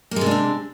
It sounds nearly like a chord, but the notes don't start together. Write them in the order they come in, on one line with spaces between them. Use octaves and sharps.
A#3 G#3 C3 D4 C4